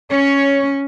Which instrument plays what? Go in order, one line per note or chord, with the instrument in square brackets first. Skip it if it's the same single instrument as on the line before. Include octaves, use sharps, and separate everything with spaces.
[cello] C#4 [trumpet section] C#5